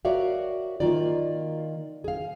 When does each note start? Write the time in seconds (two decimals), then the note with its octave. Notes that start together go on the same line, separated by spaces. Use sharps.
0.05 F#4 A#4 C#5 D5 E5 F5
0.80 D#3 A#3 F4 D5
2.04 G#4 F5